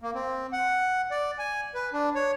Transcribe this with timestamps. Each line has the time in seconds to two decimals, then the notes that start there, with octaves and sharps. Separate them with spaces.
0.02 A#3
0.15 C4
0.53 F#5
1.11 D5
1.39 G#5
1.75 B4
1.93 D4
2.15 C#5